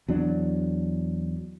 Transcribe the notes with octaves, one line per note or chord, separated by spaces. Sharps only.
E2 F#3 D4